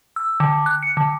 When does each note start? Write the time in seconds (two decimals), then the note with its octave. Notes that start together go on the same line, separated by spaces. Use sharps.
0.16 E6
0.40 D3
0.66 F#6
0.83 C#7
0.97 D3